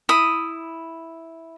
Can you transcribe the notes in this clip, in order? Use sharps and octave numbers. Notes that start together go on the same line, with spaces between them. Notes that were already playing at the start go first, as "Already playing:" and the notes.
E4 D#6